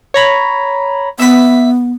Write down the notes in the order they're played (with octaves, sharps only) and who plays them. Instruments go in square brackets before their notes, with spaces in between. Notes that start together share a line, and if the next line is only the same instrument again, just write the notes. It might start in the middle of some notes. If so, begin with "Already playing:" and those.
[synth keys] C#5 A#5 B5
[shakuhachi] B3 [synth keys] E5 B6